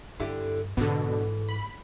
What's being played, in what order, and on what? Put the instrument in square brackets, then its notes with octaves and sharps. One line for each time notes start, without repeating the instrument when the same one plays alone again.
[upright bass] G2 [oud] D3 E4 G4
[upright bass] G#2 [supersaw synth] B2 D3 [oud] E3 A4
[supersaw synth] B5